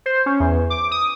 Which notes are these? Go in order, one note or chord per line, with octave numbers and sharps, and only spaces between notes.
C5
C#4
E2
D6
D#6